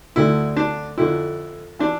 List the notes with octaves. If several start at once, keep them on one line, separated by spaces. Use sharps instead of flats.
D2 D3 E4
D4
F2 D3 E4
E3 D4